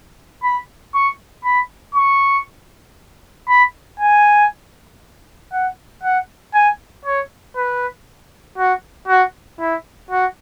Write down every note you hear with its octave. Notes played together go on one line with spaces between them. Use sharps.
B5
C#6
B5
C#6
B5
G#5
F#5
F#5
G#5
C#5
B4
F#4
F#4
E4
F#4